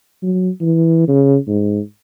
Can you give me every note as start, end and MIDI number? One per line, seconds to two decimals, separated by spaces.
0.23 0.50 54
0.61 1.05 52
1.08 1.37 49
1.48 1.80 44